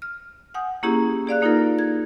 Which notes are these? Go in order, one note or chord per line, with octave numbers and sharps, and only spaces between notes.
F6
F#5 G#5 D#6 G6
A#3 C#4 E4 G4 G#4
G#4 D5 F5 F#6
A#3 D#4 F4 A4 A#4
G#6